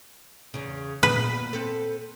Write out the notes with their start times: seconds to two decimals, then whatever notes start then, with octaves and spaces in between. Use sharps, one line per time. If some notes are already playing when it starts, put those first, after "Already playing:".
0.54 E2 C#3
1.03 A#2 B3 B4
1.53 C4 A4